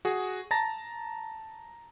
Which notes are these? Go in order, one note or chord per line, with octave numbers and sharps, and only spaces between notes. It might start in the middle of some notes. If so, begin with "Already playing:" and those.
F#4 G#4
A5 A#5 A6 A#6